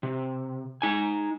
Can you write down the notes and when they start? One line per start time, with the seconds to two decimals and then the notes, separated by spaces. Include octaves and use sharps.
0.03 C3
0.82 D#4 G#5